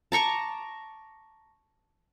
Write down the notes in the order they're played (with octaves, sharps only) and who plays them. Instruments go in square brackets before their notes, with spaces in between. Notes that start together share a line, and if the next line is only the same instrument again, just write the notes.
[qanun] A5 A#5 C#6 D6